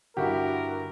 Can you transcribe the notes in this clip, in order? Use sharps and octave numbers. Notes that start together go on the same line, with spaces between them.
G2 D3 E4 F#4 G4 A#4 F#5